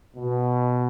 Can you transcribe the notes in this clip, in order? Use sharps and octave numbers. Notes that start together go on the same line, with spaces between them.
B2